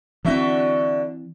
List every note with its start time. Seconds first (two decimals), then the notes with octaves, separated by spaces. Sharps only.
0.25 D3 E3 C4 F#4 E5